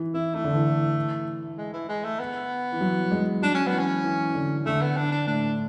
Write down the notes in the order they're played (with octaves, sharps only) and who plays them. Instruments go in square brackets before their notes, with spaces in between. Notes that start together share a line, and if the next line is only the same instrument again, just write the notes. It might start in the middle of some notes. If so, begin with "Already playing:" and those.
Already playing: [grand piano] E3
[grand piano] E3 [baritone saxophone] E4
[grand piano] E3 [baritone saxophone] A3
[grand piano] D3
E3
[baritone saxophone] G#3
E3
G#3
A3
B3
[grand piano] E3
F#3
G#3
[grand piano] F#3 [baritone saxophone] D4
[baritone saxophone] C#4
B3
[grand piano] E3
[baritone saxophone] C#4
[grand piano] E3
D3
[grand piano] D3 [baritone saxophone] A3
[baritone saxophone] B3
D4
D4
[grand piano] A2 [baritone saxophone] D4